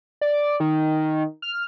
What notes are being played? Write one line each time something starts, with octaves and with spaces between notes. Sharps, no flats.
D5
D#3
F6